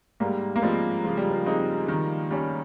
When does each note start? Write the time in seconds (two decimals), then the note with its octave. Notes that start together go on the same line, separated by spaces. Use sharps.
0.20 G#2 G3 A#3
0.56 A#3
0.62 F3 G3 G#3 C4
1.04 C#3 F3
1.17 G3
1.31 F3
1.46 G#3 C4 D#4
1.88 D#3
2.31 G3 C#4